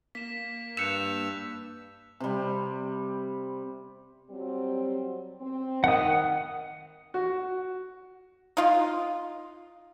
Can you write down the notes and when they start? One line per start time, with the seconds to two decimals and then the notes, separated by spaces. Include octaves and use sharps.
0.15 A#3 B6 E7
0.77 G2 E6 F#6 G6 C#7 E7 F7
2.20 C3 G3
4.30 F#3 G3 C4
5.40 C4
5.84 D#3 F#5 D#6
7.14 F#4
8.57 D#4 F4